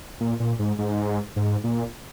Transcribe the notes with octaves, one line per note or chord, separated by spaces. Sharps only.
A#2
A#2
G#2
G#2
G#2
A#2